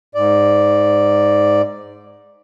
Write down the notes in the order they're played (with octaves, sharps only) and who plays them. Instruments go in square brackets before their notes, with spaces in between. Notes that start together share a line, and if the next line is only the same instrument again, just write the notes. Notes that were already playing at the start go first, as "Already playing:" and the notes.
[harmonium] G#2 D5